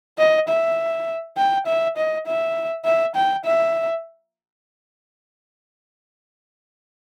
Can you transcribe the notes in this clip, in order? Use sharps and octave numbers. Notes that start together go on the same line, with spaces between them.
D#5
E5
G5
E5
D#5
E5
E5
G5
E5